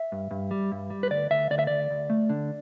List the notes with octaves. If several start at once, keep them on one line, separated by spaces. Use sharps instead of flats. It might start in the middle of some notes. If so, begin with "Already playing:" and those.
Already playing: E5
G2
G2
G3
G2
G3
B4
D2 D5
D2 E5
D2 D5
E5
D2 D5
D2
A3
D3